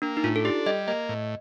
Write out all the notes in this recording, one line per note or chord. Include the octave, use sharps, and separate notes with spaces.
A#3 D4
D#4
A2 F4
A4
D4 G4
G3 D#5
A#3 D#5
A2